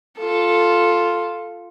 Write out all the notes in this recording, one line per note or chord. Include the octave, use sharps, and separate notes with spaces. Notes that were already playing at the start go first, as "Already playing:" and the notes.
F4 A4